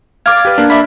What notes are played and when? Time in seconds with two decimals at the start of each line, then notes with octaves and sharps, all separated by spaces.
0.26 D5 F5 D6 G#6
0.45 G4 B4
0.58 A#3 D4
0.70 D5 E5 B5